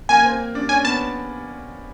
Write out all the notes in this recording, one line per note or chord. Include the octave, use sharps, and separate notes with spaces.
A#3 G#5
C4
D4
C#4 G#5
B3 A5